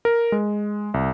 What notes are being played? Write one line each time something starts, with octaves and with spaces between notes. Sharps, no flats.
A#4
G#3
C2